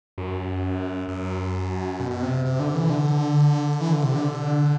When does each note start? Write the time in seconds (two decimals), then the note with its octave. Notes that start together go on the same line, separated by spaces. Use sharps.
0.18 F#2
1.08 F#2
2.00 B2
2.11 B2
2.22 C3
2.45 C3
2.60 D3
2.75 E3
2.90 D3
3.81 E3
3.93 D3
4.04 C3
4.15 D3